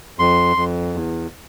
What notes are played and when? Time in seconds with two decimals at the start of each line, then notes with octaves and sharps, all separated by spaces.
0.19 F2 C6
0.57 F2
0.94 E2